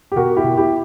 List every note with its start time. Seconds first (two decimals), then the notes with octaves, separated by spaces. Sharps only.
0.12 G4
0.16 B2 F#4 A#4
0.37 E4 G4
0.44 B2
0.57 E4 G4